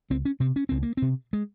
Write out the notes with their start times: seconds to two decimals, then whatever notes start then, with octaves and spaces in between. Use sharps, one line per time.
0.10 C#2 C4
0.25 C#4
0.40 C3 C4
0.56 C#4
0.69 C#2 C4
0.83 A#3
0.97 C3 C4
1.33 G#3